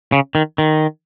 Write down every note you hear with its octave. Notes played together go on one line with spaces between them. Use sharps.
C#3
D#3
D#3